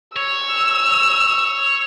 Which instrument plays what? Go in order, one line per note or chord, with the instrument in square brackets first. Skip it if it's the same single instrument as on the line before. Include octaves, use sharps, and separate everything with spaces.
[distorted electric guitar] C#5 [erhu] E6